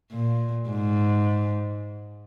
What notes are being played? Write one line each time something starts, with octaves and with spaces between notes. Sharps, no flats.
A#2
G#2